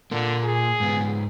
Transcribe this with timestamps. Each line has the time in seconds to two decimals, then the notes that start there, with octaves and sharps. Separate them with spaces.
0.11 A#2 D3 A#3
0.44 G#4
0.80 G#2 B3